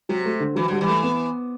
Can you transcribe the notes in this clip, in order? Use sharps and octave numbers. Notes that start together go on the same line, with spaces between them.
C3 F#3
A3
D3
E3 F#3
D3 G3
E3 G3
A3
B3